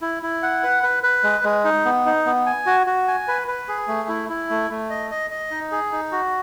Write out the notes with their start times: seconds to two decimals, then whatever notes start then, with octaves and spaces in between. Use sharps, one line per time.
0.02 E4
0.23 E4
0.43 F#5
0.63 B4
0.83 B4
1.03 B4
1.24 G#3
1.44 G#3
1.64 D#4
1.85 B3
2.06 D#4
2.26 B3
2.46 G#5
2.66 F#4
2.87 F#4
3.08 G#5
3.28 B4
3.48 B4
3.69 G#4
3.88 A3
4.09 E4
4.29 E4
4.50 A3
4.70 A3
4.90 D#5
5.11 D#5
5.31 D#5
5.51 D#4
5.72 G#4
5.92 D#4
6.12 F#4